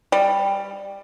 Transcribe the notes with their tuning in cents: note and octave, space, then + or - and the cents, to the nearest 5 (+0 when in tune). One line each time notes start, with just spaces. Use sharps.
G3 +10